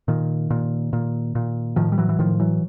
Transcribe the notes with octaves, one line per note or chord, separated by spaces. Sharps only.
A#2 D#3
A#2
A#2
A#2
A2 D#3 F3
G3
E3 F#3
E3
A2 D#3 F3
E3 F#3